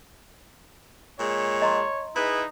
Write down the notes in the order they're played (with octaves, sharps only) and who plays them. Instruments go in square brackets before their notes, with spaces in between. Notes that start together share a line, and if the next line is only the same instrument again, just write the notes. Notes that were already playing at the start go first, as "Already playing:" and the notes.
[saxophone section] A#2 G#3 [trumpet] C#5
[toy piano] D#5 A#5 C6
[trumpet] D#4 [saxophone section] E4 G#4 B4